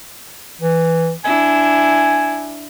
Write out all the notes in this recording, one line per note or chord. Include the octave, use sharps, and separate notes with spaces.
E3
D4 E4 G#5